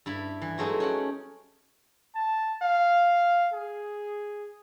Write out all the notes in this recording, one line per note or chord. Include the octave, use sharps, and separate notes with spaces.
G2 E4 B5
E3
F#3 G#3 A3 C4 D#4
C#4 F#5 G5
A5
F5
G#4